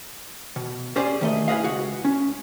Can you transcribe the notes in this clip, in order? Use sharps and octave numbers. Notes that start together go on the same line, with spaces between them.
B2
C#4 G4 G#4 C5 D5
D#3 A3 D#5
E4 G#4 B4 D#5 F5
C#2 F#4
C#4